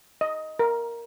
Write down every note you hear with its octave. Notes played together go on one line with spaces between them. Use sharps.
D#5
A#4